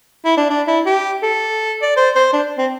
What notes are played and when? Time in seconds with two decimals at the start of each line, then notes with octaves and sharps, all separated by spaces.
0.25 E4
0.37 D4
0.49 D4
0.67 E4
0.86 G4
1.23 A4
1.82 D5
1.97 C5
2.15 C5
2.33 D4
2.58 C4